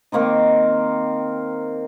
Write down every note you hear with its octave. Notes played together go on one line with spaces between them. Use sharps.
D#3 A#3 C4 D#4